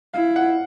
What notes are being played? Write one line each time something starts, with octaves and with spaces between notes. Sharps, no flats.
E4 F5
F#5